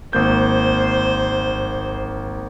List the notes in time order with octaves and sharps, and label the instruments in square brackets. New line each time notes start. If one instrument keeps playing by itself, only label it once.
[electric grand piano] G#1 A#3 G6 [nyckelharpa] C5